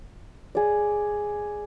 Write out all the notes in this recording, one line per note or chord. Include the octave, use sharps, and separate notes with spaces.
G#4 D5